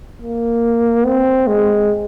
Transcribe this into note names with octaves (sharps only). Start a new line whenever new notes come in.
A#3
C4
G#3